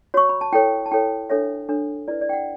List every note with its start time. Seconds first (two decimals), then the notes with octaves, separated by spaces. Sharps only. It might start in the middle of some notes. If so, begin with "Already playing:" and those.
0.14 F#4 C#5 C#6
0.29 B5
0.41 A5
0.52 E4 A4 C#5 G5
0.86 A5
0.91 E4 A4 C#5 G5
1.30 D4 A4 C#5 E5
1.69 D4 A4 C#5
2.08 E4 B4 D5
2.21 D5
2.29 G5
2.33 F#5